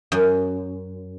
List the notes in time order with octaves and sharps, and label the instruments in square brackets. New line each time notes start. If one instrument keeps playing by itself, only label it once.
[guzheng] F#2